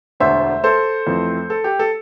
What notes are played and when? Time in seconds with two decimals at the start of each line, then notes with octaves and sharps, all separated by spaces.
0.20 E1 D2 D3 A3 C5 E5
0.64 A4 C5
1.07 F2 E3 A3 C4
1.50 A4
1.64 G4
1.79 A4